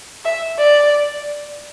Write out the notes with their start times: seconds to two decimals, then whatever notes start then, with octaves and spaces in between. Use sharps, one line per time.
0.25 E5
0.59 D5